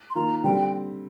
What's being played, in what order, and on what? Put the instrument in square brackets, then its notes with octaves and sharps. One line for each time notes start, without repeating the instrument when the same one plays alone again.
[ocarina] C6
[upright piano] D#3 A#3 F4 [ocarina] A#5
[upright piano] D3 G3 C4 [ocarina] G5